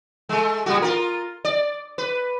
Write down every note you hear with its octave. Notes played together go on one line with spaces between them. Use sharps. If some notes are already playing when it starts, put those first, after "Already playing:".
G#3 A3
A#2 G3 F#4
F4 A#4
D5
B4